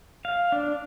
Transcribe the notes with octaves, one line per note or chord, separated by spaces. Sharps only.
F5
D4